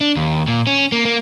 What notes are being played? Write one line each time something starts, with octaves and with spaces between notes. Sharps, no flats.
D4
D#2
A#2
C#4
A#3
A#3